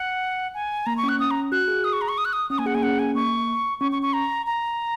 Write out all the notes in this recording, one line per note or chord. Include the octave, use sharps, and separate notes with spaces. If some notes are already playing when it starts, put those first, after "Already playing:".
Already playing: F#5
G#5
A#3 A#5
C#6
C#4
F#6
C#4 D#6
A#5
F#4 F#6
G#4
D#6
C#6
A#5
C#6
D#6
F#6
D#6
C#4 D#6
A#3 G#5
G#4 F#5
A#3 G#5
C#4 F#5
G#5
A#3 C#6
C#4 C#6
C#6
C#6
A#5
A#5